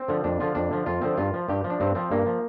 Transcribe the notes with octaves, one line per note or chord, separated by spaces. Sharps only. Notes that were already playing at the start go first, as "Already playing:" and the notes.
Already playing: C4
D3 F3
F2 D4
D3 F3 F4
F2 D4
D3 F3
F2 F4
D3 F3 C4
G2 F4
F3
G2 G4
F3
D4
G2 C4
F3 C4
G2 A#3
F3